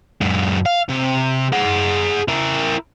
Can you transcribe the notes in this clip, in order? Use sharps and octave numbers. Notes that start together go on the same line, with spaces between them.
F#2 G#3
F5
C3
G#4 F#5
E4 A#4